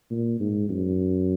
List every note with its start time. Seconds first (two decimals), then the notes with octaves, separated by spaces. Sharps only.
0.11 A#2
0.40 G#2
0.69 F#2